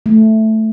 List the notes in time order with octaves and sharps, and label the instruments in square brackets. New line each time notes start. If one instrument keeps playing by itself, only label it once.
[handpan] A3